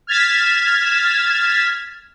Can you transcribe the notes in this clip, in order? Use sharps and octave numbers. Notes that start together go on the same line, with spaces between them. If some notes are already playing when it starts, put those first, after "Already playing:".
F6 G#6 A6 B6 E7